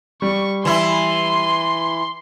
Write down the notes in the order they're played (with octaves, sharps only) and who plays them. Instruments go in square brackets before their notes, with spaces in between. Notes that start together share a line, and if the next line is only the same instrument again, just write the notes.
[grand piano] G3 [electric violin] C#6
[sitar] E3 E4 [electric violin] C6